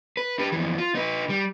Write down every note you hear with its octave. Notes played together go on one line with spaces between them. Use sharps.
B4
G4 B4
F2 E3
F4
D#4 B4
G3